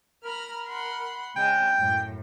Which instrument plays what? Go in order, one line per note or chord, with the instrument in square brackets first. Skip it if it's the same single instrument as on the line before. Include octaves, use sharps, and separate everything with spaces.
[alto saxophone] A#4 [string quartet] A#5 B5 F6
[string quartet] F#5 B5 C6
[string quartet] C#3 G#3 D#5 [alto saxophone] G5
[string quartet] F#2 A2